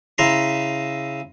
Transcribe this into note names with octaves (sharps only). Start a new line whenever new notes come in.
C#3 E4 A#5 C6